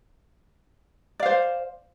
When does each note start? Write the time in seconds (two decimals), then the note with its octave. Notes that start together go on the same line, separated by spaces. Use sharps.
1.20 D5
1.23 F5
1.26 C5